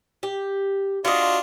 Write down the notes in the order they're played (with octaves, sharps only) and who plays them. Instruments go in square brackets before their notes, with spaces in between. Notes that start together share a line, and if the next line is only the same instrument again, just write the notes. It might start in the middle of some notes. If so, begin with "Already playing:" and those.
[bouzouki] G4
[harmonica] D4 F4 [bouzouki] F#4 D#5